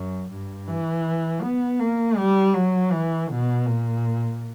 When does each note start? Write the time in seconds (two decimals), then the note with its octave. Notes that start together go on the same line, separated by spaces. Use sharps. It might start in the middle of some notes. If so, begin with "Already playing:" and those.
Already playing: F#2
0.30 G2
0.68 E3
1.42 B3
1.80 A#3
2.17 G3
2.54 F#3
2.92 E3
3.30 B2
3.66 A#2